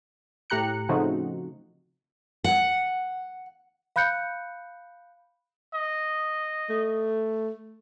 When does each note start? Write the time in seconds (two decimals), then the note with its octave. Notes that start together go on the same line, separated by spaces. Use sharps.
0.50 A2 G4 A#5 F#6 C#7
0.89 C#3 F3 A3 C4 D#4 F#4
2.44 F#5
3.96 F5 B5 F#6 G6 C#7
5.74 D#5
6.70 A3